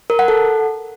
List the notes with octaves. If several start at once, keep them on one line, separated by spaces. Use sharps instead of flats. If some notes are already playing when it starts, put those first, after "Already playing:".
A#4
F#5
A4